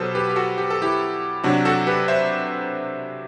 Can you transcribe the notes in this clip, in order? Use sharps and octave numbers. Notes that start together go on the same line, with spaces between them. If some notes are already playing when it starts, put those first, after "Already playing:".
Already playing: B2 F#3 G4 A4 B4 C5
G4 B4
G4
F#4 A4
G4
A4
E4 G4
C3 F#3 D4 F#4
F#4 A4
G4 B4
C5 E5